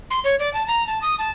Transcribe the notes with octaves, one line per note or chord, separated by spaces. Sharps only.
C6
C#5
D5
A5
A#5
A5
D#6
A5